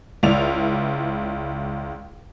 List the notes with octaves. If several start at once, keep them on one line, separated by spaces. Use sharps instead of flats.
C#2 E4 D5 F7